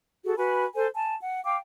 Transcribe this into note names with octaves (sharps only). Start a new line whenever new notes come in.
F#4 G#4 A4
F#4 B4 G#5 B5
A4 C5 G#5
G#5 A5
F#5
F5 G5 D6